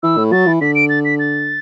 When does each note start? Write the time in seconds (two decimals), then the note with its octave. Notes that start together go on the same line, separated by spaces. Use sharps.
0.03 E3 E6
0.17 A2
0.32 F#3 A6
0.47 E3
0.61 D3 B6
0.75 D7
0.89 A6
1.05 B6
1.19 A6